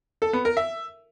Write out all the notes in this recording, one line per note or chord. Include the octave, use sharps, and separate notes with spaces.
A4
B3
A#4
E5